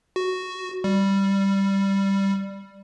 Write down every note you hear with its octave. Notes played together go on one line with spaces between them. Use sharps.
F#4
G3